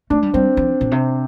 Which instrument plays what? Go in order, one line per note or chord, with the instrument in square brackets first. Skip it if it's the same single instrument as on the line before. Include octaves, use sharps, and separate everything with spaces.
[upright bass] A3 [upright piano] D4
[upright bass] G3
[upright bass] G3 [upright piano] C4
[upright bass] F3
A#2
C3